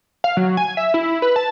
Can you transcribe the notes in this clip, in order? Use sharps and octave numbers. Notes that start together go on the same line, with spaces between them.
F5
F#3
G#5
E5
E4
B4
A5